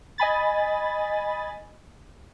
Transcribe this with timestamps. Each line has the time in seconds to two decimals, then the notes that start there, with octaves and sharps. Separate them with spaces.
0.18 D#5 G#5 B5 A6